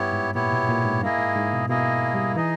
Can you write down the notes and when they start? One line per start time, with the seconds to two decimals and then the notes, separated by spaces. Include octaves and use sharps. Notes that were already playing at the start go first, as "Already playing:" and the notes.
Already playing: G2 B3 E4 G4 C#5
0.13 G#2
0.34 A#2 B3 E4 G4 C#5
0.52 B2
0.69 A#2
0.85 G#2
1.02 G2 A#3 E4 G#4 D#5
1.19 G#2
1.36 G#2
1.53 B2
1.69 B2 A#3 E4 G#4 D#5
2.14 G3
2.36 E3 D#4 G#4 D#5